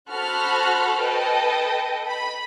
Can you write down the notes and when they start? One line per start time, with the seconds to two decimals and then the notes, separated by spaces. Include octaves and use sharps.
0.10 F#4 A4 C5 B5 F6 F#6
1.01 A4 B4 D#5 G5
2.07 B5